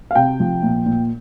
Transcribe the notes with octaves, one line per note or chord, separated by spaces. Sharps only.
F5
C3 G5
F3
A#2
A#2